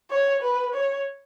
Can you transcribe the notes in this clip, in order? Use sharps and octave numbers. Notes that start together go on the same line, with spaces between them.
C#5
B4
C#5